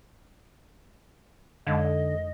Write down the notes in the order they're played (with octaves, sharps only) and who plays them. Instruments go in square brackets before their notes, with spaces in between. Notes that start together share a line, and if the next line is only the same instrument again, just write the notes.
[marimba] F2 G#3 [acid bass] D3 [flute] D#5